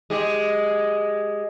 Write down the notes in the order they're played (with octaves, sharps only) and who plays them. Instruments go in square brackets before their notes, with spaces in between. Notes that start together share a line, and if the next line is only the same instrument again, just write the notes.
[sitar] G#3 G4 D#5